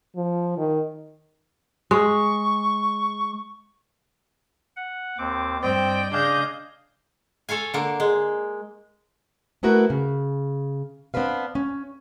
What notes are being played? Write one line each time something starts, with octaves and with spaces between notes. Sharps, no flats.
F3
D#3
G#3 C#6
F#5
D#2 C4 D6
G2 C4 D5 D#5 G5
C#3 D4 G#4 D#5 F5 G6 A#6
A4 C#5 F5 G#5
D3 A#3
G#3
A3 B3 E4 F#4 A#4 B4
C#3
B3 C4 D4 B4 F5
C#4